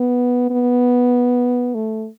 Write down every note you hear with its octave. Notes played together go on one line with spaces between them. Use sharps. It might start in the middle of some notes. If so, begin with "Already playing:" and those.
Already playing: B3
B3
A3